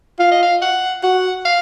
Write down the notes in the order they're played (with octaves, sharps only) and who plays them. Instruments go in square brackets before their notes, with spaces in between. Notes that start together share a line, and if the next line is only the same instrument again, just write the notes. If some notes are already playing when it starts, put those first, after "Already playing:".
[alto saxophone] F4 [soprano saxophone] F5
[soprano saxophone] D#5
F5
F#5
[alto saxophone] F#4 [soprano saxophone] F#5
[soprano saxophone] F5